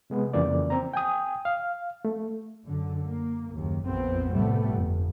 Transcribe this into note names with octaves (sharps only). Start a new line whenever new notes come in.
C3 G#3 B3
F2 C#3 E3 A#3 D5
C4 A#5
G5 G#5 D#6
F5
A3
F#2 D3
A#3
F#1 D#2
A#1 F2 B3 C4
A2 C3 F3 G3 A3 B3
G1 F2